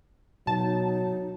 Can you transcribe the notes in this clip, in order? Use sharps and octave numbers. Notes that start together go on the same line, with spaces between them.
B2 F#3 D#4 A5